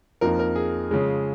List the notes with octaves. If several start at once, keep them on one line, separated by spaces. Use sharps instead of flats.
F2 F3 A#3 D#4 A#4
A#4
G#4
C#3 F3 G#3